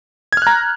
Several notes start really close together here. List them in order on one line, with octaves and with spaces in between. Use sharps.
G#6 F6 F#6 A#5